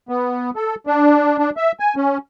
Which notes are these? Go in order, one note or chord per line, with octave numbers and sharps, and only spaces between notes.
B3
A4
D4
D4
E5
G#5
C#4